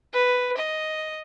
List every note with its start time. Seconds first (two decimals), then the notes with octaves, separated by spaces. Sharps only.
0.13 B4
0.57 D#5